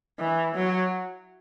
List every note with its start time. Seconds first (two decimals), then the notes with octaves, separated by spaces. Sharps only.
0.19 E3
0.55 F#3